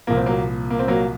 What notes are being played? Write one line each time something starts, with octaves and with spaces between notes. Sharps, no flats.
C2 A#2 F3 A#3
C4
F#3 A#3
A#3
C4
F#3 A#3